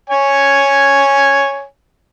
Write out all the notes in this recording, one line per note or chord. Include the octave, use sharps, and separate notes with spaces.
C#5 G#5